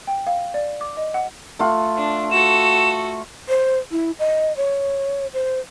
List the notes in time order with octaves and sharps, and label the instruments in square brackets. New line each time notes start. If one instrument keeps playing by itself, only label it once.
[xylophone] G5
F5
D5
D6
D#5
F#5
[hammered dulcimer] A3 F4 F#5
[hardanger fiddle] D4
[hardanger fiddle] F#4 A4 [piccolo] E7
[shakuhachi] C5
E4
D#5
C#5
C5